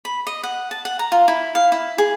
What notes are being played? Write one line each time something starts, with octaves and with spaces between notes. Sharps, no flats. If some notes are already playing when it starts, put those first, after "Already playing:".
B5
D#5
F#5
A5
F#5
A#5
F4
E4
F5
E4
G#4